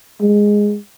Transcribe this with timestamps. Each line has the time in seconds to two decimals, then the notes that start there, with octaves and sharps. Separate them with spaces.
0.21 G#3